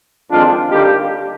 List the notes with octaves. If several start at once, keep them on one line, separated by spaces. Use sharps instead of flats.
F2 D#3 G#3 C4 D4 F4
D#2 D3 G3 A#3 D#4 G4